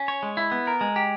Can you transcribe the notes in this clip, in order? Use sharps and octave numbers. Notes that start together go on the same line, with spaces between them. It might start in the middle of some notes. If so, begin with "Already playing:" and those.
Already playing: C#4
C#5
G#3
E4
B3
A#4
G#3
G4